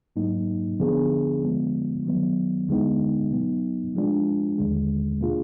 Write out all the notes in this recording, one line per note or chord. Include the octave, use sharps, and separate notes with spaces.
G#2 F#3 A#3 D#4
D3 F3 B3 D4 G#4
D2 D3 F3 G#3 B3
D#3 F#3 B3
D2 D3 G#3 B3 D#4
B2 F#3 B3 D#4
F3 G#3 D4 F4
D#2 D3 G#3
B2 A#3 D4 F4 G#4